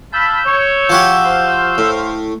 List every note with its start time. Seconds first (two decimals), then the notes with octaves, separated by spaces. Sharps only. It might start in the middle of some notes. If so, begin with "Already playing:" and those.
0.13 F5 A5 B5 E6 G6
0.45 C#5
0.90 F3 F#4 G4
1.25 C5 F5
1.78 A2